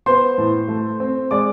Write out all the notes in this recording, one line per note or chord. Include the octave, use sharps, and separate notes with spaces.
B3 C5 C6
A2
A3
C4
G#3 D5 D6